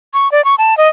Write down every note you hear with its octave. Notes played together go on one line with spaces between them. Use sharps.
C#6
D5
C#6
A5
D#5